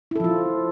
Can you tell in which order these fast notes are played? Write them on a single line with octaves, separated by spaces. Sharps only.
E4 A4 F3 F4